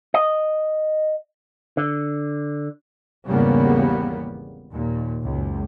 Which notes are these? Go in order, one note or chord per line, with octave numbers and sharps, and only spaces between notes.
D#5
D3
G#1 E2 C#3 G3 A#3 B3
D#2 A#2
F#1 C#2